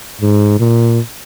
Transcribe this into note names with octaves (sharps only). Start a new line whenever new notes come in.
G#2
A#2